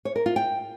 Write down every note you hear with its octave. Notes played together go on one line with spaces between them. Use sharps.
C#5
A#4
F4
G5